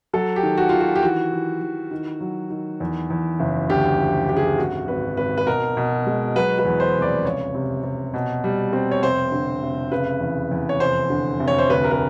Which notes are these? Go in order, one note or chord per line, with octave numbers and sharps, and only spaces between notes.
F#3 A4
G4
D#3
F#4
D#3 F4
F#4
G4
E3 F#4
E3
E3
D#3
F#3
D#3
E2
E2
F#1
D2 G4
F3
D3 G4
G#4
G4
G#1 F#4
G#1 B4
G#1 B4
B4
B2 A#4
B2
G#3
F#3 B4
B4
E2
C5
F1
D5
C#2 C#5
C3
C3
B2
G3
C4
C#5
F1 C5
D3
F1
C#3 B4
E2
E2
C#5
F1 C5
D3
F1
C#5
C5
D2 B4
A#4
B4